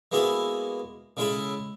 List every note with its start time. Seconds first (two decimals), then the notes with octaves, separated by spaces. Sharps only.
0.12 G#3 A#3 B3 E4 F#4 E5
1.17 C#3 G#3 E4 A4 E5 B5